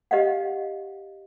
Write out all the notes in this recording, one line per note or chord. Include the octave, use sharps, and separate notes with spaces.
G4 D#5 F5 F#5